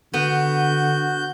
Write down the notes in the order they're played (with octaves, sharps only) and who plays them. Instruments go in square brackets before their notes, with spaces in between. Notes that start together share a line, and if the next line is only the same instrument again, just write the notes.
[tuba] D3 [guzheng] B3 [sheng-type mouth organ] F#4 G6